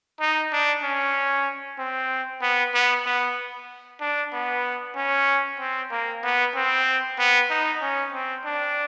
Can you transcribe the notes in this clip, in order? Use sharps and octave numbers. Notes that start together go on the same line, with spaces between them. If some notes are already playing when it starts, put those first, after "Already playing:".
D#4
D4
C#4
C4
B3
B3
B3
D4
B3
C#4
C4
A#3
B3
C4
B3
D#4
C#4
C4
D4